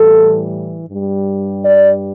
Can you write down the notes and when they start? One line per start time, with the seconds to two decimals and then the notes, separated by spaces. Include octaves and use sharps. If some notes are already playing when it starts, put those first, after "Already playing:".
Already playing: A2 E3 G3 A4
0.89 G2 G3
1.65 D5